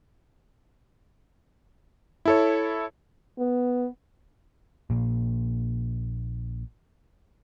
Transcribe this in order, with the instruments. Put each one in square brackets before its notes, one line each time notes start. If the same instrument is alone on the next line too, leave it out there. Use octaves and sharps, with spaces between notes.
[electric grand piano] E4 A4 C#5
[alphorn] B3
[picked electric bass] A#1 A#2 A#3